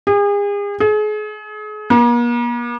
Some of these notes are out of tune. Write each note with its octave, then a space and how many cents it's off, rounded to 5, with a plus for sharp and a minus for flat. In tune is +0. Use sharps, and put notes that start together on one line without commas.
G#4 -40
G#4 +35
A#3 +45